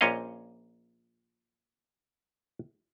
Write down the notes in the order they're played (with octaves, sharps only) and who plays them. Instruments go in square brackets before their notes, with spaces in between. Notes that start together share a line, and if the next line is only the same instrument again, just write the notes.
[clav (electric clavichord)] A#1 A#2 C#4 C#5 D#5 F5